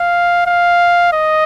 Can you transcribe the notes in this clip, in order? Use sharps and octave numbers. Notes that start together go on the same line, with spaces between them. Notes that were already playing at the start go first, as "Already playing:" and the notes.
Already playing: F5
F5
D#5